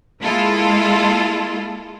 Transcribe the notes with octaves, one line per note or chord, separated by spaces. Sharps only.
G#3 A#3 E4 F4 A4